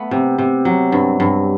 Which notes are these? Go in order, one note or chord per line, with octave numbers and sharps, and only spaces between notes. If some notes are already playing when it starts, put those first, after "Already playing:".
Already playing: A3 B3
C3
C3
F#3
G2
G2